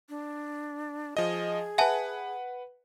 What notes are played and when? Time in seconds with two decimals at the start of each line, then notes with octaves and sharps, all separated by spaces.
0.09 D4
1.17 F3 G#4 D#5
1.78 B4 E5 F#5 G#5 A5